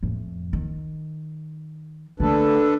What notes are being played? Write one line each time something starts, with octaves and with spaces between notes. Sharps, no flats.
F2 A2
D#3
D3 A3 D4 A4 B4